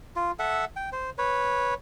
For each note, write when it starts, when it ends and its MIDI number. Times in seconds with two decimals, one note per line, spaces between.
0.16 0.31 65
0.39 0.65 69
0.39 0.65 76
0.39 0.65 78
0.76 0.90 79
0.92 1.10 72
1.18 1.74 71
1.18 1.74 73